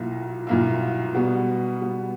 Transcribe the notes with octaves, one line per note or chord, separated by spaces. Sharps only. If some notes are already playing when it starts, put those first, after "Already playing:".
Already playing: B1 A#2 A#3 E4
B1 A#2 A#3 E4
B2 G3 B3
B2 G3 B3